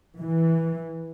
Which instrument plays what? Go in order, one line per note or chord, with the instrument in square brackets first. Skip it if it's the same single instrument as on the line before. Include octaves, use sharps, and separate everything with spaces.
[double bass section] E3